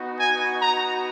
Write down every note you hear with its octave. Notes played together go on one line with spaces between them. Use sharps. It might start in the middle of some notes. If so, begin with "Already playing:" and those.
Already playing: B3 D#4 F#4
G#5
A#5